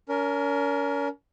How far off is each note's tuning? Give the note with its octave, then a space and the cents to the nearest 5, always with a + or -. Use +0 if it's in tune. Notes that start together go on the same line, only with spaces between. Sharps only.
C#4 +40 A#4 +0